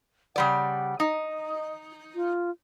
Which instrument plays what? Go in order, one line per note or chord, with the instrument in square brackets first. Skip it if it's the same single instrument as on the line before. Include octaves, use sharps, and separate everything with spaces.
[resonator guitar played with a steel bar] C#3 G3 D5 [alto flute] F#5
[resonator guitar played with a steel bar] D#4 [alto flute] D#5
[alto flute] F4